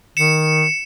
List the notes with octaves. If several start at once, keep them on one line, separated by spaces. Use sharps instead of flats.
D#3 C#7 E7